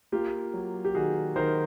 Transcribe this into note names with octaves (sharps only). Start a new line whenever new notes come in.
A#3 F4 G4
F#3
G4
D#3 F#4 G#4
D#3 A#4 C5